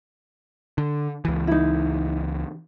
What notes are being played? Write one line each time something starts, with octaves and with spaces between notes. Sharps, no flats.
D3
C#2 E3
D#4 E4